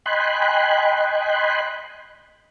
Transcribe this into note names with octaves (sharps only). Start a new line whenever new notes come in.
D#5 G5 G#5 B5 C6 F#6